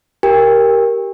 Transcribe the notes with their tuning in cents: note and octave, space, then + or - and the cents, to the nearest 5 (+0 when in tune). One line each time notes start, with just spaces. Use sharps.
G4 -10 A#4 +0 G5 +40